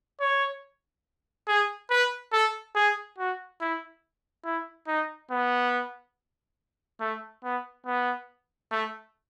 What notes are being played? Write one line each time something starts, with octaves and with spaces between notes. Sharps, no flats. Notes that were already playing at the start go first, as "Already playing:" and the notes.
C#5
G#4
B4
A4
G#4
F#4
E4
E4
D#4
B3
A3
B3
B3
A3